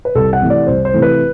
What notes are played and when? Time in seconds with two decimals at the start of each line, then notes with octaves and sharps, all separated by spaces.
0.05 B4
0.15 C2 A4
0.33 F#5
0.42 C3 E3 A3
0.50 D5
0.67 C2 C5
0.85 C5
0.94 C3 E3 A3
1.02 B4